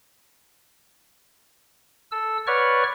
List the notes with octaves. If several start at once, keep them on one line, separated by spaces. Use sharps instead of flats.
A4 E6
B4 C#5 D5 F#5 C#6 F6